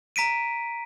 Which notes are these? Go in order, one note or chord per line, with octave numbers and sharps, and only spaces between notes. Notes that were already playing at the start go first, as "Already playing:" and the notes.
A#5 B6 D7 D#7